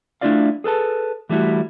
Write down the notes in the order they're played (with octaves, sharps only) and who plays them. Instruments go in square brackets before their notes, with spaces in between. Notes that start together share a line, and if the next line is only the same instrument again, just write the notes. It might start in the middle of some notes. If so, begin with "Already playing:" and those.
[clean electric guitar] A3 D4 E4 F4 D5 F5
G#4 A4 B4 A5
E3 G3 A3 E4 F#4